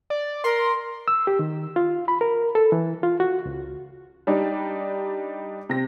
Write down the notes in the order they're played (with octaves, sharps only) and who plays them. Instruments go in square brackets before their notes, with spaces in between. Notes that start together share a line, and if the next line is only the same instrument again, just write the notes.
[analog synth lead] D5
[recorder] A#4 [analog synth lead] C6
[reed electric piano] E6
G4
D#3
F4
B5
A#4
A4
E3
F4
F#4
C#2
[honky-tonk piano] G3 D4 D#4
C3 A#6